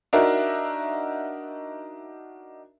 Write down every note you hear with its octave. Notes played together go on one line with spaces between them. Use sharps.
D4 D#4 F#4 A#4 E5